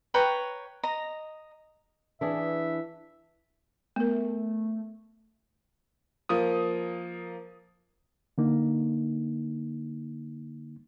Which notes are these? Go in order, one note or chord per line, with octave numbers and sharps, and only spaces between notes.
B4 C#5 G5 A#5
D#5 A#5
E3 D4 G#4 E5
A3 B3 A#4
F3 A#3 D#6
D3 A#3 D#4